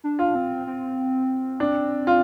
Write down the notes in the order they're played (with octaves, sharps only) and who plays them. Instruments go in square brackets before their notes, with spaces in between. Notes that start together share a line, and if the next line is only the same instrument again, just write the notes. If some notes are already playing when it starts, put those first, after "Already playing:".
[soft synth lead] D4
[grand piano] F4
[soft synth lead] C4
C4
[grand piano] D4
F4